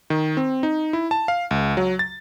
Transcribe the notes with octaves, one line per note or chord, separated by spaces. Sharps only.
D#3
C4
D#4
E4
A5
F5
C#2
F#3
A6